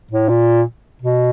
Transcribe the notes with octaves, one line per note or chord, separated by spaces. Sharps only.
A2
A#2
B2